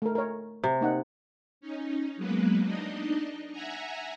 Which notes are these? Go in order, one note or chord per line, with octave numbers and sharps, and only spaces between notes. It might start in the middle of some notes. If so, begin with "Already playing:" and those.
A3 A#4
A#4 C#5
C3
A#3 D#4 F#5
C#4 D#4
F#3 G#3 A#3 B3 B4
D4 D#4 D#5
E5 F#5 G#5 A#5